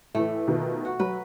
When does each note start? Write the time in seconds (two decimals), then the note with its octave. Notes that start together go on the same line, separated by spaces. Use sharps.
0.15 A2 E3 A3
0.47 B2 D#3 F3
0.85 F#4
1.00 F#3 B4